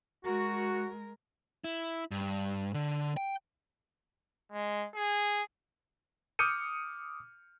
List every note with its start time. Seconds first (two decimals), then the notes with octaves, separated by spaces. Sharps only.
0.25 G#3 F#4 A#4
1.64 E4
2.11 G2
2.74 D3
3.17 G5
4.52 G#3
4.95 G#4
6.39 D6 D#6 F6 G6 C#7 D#7